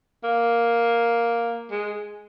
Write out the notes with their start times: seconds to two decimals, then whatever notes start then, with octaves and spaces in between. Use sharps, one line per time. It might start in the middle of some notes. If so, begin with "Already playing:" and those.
0.24 A#3
1.71 G#3